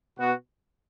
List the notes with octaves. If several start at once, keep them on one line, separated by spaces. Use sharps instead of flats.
B2 B3 F#4